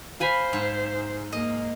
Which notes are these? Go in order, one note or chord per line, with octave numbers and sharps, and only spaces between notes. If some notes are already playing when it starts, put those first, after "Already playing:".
C5 F5 G#5 B5
G#2
A#3 D#5